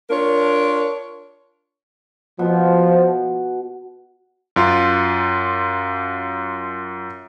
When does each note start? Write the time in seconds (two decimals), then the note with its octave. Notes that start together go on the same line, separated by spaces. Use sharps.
0.10 D4 F4 A#4 C#5
2.39 B2 F3
4.56 F#2 F4